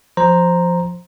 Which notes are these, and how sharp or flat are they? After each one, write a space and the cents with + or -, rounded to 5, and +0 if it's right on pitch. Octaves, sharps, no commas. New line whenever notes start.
F3 +0 C5 +0 A#5 +0